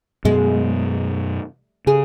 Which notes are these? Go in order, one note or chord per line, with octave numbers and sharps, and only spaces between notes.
F#2 B2 G#3
C#3 G#4